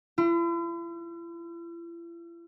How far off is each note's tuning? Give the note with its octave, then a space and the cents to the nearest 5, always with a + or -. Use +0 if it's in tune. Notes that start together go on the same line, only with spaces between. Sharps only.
E4 +45